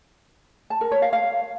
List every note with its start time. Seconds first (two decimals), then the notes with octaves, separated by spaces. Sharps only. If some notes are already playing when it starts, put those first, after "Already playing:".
0.70 A5
0.81 A#4
0.92 C#5
1.02 F5
1.13 F5